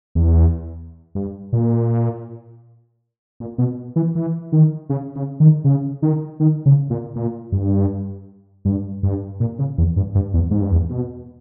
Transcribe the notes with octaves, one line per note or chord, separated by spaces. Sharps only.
E2
G2
A#2
A#2
B2
E3
E3
D#3
C#3
C#3
D#3
C#3
D#3
D#3
C#3
A#2
A#2
G2
G2
G2
A#2
C#3
E2
G2
G2
E2
G#2
G2
E2
B2